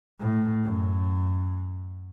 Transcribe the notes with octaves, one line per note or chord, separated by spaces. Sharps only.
A2
F#2